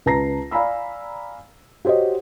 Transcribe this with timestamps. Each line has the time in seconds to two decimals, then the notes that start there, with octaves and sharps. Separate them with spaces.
0.06 C#2 B4 A5 A#5 A#6 C7
0.51 D5 F5 G#5 A#5 B5 E6
1.85 F#4 G4 C5 C#5 D#5